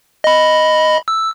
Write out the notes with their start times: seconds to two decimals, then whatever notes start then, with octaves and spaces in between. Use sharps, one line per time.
0.24 D#5 B5
1.08 E6